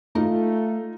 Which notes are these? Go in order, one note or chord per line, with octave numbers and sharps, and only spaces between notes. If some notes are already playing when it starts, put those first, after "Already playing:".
A3 D#4 F4